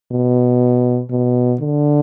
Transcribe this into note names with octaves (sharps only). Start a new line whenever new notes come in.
B2
B2
D3